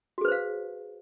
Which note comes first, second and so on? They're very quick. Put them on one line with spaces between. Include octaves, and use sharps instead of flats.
F#4 G#4 B4 C5 F5